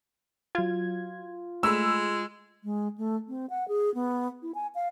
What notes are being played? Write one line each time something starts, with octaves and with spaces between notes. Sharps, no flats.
F#3 F4 G#6
G#3 A3 G#4 B5 E6
G#3
A3
C4
F#5
G#4
B3
E4
G#5
F5